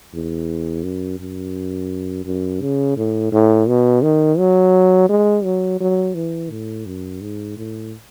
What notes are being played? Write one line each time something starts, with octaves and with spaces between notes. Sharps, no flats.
E2
F#2
F#2
F#2
C#3
A2
A2
B2
D#3
F#3
G#3
F#3
F#3
E3
A2
F#2
G#2
A2